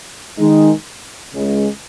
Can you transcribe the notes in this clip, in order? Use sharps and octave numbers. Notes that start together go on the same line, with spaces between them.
D#3 G#3 D#4
C#2 C#3 G#3